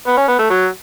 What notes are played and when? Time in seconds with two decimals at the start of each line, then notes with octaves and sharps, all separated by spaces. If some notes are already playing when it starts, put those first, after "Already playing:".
0.07 B3
0.17 C#4
0.28 B3
0.39 A3
0.50 F#3